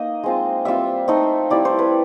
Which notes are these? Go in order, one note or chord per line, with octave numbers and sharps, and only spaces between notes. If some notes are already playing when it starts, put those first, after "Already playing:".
Already playing: A#3 D#4 D#5
G#3 C4 F4
G3 C4 F4 E5
A3 C4 D#4
G3 C4 E4 D5
C5
B4